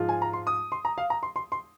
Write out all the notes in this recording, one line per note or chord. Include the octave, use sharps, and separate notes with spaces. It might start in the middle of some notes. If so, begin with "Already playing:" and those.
Already playing: G#2 F3 G#3 F4
G#5
A#5
C6
D#6
C6
A#5
F5
A#5
C6
C6
C6